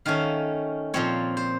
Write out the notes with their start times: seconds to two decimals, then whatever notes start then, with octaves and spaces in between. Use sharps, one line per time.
0.05 D#3 A3 C#4 F5
0.94 A#2 F3 C4 C#5
1.37 C5